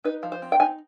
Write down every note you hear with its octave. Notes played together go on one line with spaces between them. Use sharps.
D#4 B4
F3
C5
C4
G5
D#4 G#5